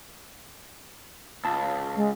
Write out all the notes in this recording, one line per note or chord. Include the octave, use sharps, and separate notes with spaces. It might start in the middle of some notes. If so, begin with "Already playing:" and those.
C#2 A5
G#3